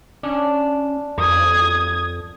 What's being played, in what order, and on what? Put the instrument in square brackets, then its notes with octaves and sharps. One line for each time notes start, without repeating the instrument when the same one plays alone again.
[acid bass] C#4 [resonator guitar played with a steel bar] D4
[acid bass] F2 [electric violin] D#6 G#6